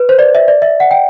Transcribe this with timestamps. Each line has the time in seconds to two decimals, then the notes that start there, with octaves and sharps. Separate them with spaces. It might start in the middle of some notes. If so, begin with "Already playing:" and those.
Already playing: B4
0.09 C5
0.19 D5
0.35 E5
0.48 D5
0.62 E5
0.80 F#5
0.91 G5